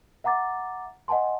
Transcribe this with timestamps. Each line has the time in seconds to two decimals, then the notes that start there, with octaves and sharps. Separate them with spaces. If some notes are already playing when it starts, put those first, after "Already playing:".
0.24 E5 F#5 A#5 D6 A6
1.08 D#5 F#5 G#5 A5 C6